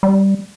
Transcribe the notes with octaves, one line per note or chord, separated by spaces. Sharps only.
G3